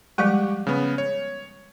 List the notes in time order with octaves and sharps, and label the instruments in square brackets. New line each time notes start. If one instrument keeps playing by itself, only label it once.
[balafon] F3 G3 G#3 [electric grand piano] G4 F#5 C#6
[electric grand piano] C#3 B3
C#5